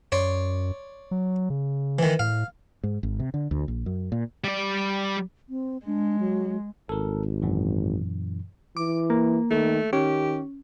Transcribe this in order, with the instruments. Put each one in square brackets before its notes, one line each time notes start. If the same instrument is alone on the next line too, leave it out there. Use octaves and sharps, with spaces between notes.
[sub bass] F#2 [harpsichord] C#5 D5 C6
[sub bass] F#3
C#3
[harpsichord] D#3 E3
[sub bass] A2 [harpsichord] F5
[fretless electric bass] G#2
G#1
C3
D3
D2
A#1
F#2
A#2
[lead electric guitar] G3 D5
[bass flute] C4
[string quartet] G#3 [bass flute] D4
[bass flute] F#3
[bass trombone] G#1 [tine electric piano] A4 A#4
[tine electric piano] F#2 A#2 E3
[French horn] E3 [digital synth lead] D6
[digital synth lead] A#3
[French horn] D#3 [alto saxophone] A3
[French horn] D#3 [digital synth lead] C#4 [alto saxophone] G4